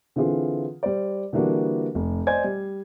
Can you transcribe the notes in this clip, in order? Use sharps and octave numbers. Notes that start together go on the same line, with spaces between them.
D3 E3 C4 F4 G#4
G3 C5 D5
D3 E3 G3 A#3 D4 F#4
F1
C5 D5 D#5 G#5 G#6
G3